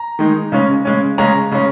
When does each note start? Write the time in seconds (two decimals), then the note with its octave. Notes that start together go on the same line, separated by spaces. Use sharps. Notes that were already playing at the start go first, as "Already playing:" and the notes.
Already playing: A#5
0.19 D#3 G#3 D#4
0.52 C#3 G#3 C#4
0.85 C#3 G#3 C#4
1.18 C#3 G#3 C#4 A#5
1.51 C#3 G#3 C#4